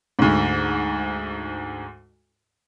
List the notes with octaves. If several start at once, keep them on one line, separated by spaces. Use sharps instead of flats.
D2 G#2